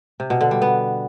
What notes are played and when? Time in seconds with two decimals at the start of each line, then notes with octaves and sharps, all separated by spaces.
0.20 C3
0.30 B2
0.41 D3
0.51 G3
0.62 B3